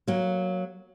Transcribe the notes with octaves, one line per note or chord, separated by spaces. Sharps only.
F#3 A#3